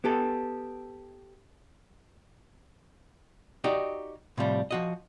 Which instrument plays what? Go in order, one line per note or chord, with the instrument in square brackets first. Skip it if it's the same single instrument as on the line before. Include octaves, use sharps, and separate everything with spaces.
[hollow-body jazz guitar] B3 G4 A4
D#4 F#4 G4 D5 D#5
A2 C3 F3 G3
F3 F#4 D#5